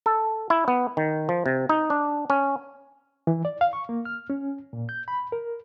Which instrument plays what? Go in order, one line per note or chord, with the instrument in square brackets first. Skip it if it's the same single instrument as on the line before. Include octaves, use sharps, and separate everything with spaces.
[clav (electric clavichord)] A4
E4
B3
D#3
F3
C3
D#4
D4
C#4
[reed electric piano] E3
D5
F5
C#6
A#3
F6
C#4
A#2
G6
B5
A#4